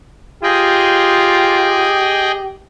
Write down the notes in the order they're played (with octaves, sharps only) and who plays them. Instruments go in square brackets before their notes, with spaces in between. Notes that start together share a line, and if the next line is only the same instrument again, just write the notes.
[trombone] F4 [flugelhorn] G4 [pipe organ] G#4 D#5 G5